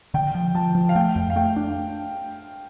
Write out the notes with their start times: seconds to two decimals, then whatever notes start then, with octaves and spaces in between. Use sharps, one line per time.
0.14 D3 G5
0.35 F3
0.55 F3 A5
0.75 F3
0.89 F5
0.96 A3 G5
1.16 F2
1.30 F5
1.36 A3 G5
1.56 D4